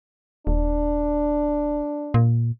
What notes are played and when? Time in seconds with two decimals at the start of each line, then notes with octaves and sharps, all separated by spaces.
0.47 D#1 D4
2.14 A#2